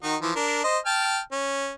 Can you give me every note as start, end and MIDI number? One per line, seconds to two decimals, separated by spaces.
0.03 0.16 51
0.03 0.16 63
0.03 0.16 66
0.22 0.31 52
0.22 0.31 53
0.35 0.59 62
0.35 0.59 70
0.64 0.78 72
0.64 0.78 75
0.86 1.20 79
0.86 1.20 81
0.86 1.20 89
1.32 1.72 61